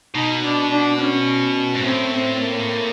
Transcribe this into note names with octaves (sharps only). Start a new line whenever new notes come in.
B2 D#4
D4
D4
C#4
G#2
A2 C4
C4
A#3